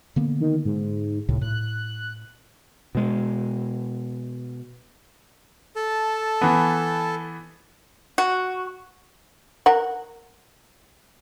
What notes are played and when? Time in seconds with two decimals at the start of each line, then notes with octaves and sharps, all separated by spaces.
0.16 D3 A#3 B3
0.40 D#3
0.65 G#2
1.29 C#2 A2 C3
1.41 A2 F#6
2.95 B2 G#3
5.76 A4 A5
6.41 E3 B3
8.18 F#4
9.66 A#4 F#5